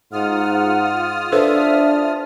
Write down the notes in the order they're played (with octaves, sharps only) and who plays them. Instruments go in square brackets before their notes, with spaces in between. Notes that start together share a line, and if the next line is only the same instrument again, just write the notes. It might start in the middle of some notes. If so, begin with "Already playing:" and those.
[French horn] G#2 [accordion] F4 D#6 F6 [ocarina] F#5
[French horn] D4 [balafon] A4 B4 C5 [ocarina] E5